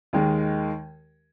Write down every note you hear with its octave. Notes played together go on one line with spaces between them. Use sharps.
D#2 D#3 G#3